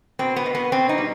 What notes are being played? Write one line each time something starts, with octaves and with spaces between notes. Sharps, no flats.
B2 C4
B3
B2
B3
B2 C4
D#4
G3